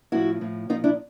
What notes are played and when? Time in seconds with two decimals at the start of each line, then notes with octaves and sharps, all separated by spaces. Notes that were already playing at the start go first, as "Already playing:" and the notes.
0.12 A2 F3 E4 F#4
0.41 A2 F3
0.69 A#2 F3 D#4 F4
0.84 D4 E4